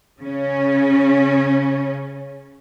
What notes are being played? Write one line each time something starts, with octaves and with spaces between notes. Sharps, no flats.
C#3 C#4